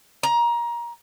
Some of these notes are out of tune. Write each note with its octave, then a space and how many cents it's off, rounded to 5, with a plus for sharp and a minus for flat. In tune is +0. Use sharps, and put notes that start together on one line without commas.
A#5 +20